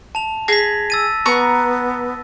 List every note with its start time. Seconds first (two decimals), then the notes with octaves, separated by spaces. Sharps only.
0.15 A5 F7
0.48 G#4 A#6 B6
0.90 E6 A6 D#7
1.26 B3 A#5 C#6